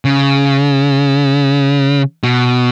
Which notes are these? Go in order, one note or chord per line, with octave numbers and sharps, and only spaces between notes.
C#3
B2